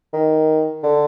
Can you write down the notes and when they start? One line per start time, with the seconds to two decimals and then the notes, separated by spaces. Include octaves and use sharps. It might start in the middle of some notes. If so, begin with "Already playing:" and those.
0.13 D#3
0.83 D3